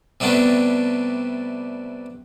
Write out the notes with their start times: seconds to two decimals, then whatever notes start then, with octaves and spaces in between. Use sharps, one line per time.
0.20 C3 G3 A3 B3 D4